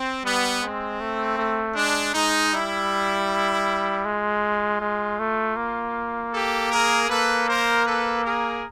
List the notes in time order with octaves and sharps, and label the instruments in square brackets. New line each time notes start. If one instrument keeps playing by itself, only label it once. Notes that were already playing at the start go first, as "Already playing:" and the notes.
Already playing: [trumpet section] C4
[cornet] G3 [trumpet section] B3
[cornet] G#3 [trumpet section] C4
[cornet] A3
A3
[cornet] G#3 [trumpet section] D4
[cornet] G#3 [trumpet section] D#4
[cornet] G3 [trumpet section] E4
[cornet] G#3 [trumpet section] F4
[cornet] G#3
A3
A#3
[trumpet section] G4 A4
G#4 A#4
[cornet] A#3 [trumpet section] A4 B4
[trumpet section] A#4 C5
A4 B4
G#4 A#4